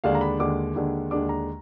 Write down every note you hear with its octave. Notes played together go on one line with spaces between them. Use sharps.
D#2 D3 G#3 D4 F5
A#5
B5
D#2 D3 G#3 D4 D6
D#2 D3 G#3 D4
D#2 D3 G#3 D4 D6
A#5